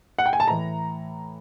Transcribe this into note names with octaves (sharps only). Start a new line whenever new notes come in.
F#5
G5
G#5
A5
A2 E3 A#5